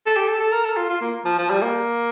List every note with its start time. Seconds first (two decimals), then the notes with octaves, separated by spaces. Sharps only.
0.06 A4
0.16 G4
0.28 A4
0.40 A4
0.52 A#4
0.65 A4
0.76 F4
0.89 F4
1.01 A#3
1.25 F3
1.38 F3
1.50 G3
1.62 A#3